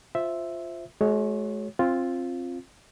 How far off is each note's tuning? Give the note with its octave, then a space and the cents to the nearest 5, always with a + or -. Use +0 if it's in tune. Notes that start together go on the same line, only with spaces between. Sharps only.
F4 +0 C5 +0 E5 +0
G#3 +40 F#4 +5 C#5 +0
C4 +20 F4 +0